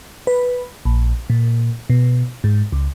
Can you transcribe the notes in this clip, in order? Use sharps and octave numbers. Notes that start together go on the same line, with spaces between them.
B4
A#1
A#2
B2
G#2
C#2